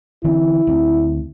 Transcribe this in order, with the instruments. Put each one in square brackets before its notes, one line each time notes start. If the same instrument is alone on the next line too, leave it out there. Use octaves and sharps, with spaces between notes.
[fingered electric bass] D3 E3 C4 [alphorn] E4
[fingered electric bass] D2 C4